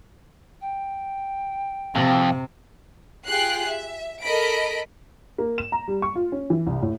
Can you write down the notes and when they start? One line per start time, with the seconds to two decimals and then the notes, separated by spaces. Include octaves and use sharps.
0.61 G5
1.95 F2 C3
3.26 F4 G4 G#4 G5 F#6 C7
3.68 E5
4.22 A4 A#4 D#5 B5 B6 D7
5.38 A#3
5.58 E7
5.72 A#5
5.88 G3
6.02 C#6
6.16 F4
6.32 C#4
6.50 E3
6.67 C2
6.82 A2